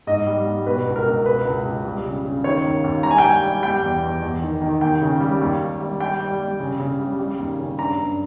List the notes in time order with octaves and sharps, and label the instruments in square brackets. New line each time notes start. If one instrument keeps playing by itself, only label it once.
[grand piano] G#2 D#5
G3
G3
B2 B4
C#2
A#4
C#2
B2 B4
C#2
C#2
G3
C#3
C#3
D#3 C#5
D#2
D#2
G3 A#5
G#5
G5
G3 G#5
G3
G3 G5
E2
E2
E2
D#3
D#3
D#2 G5
C#3
G3
D#2
D#2
G3
G3 G5
G3
G3
C#3
C#3
G3
G3
D#2
C#3
G2 A#5
G2